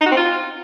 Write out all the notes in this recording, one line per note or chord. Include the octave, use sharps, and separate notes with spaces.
D#4
F#4
C4
F4